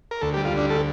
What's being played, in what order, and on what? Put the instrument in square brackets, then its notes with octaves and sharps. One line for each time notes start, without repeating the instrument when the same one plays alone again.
[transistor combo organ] A#4
D2 A4
G4
G3
F4
D2 D4
A4